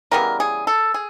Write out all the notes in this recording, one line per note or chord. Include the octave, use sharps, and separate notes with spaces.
C#3 E3 G3 B3 A#4
G#4
A4
G#4